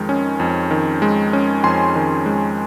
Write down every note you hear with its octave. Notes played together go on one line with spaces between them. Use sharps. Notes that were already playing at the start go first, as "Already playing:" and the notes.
Already playing: F2 D#3 G#3
C#4
F2
D#3
G#3
C#4
F2 G#5 C6
D#3
G#3